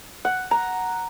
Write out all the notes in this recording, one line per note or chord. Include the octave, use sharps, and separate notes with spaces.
F#5
A#5